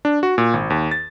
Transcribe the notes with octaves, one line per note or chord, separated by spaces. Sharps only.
D4
F#4
A#2
G#1
D#2
A6